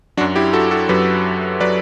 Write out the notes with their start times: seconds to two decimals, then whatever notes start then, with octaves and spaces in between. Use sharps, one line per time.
0.17 F#3 D4 F#4
0.21 F#2
0.35 E4 G4
0.53 F#4 A4
0.71 F#4 A4
0.89 F#2 F#3 G4 B4
1.60 F#3 B4 D5